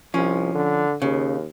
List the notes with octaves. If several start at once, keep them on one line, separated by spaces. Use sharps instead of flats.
C2 F3 C#4
D3
D#2 C#3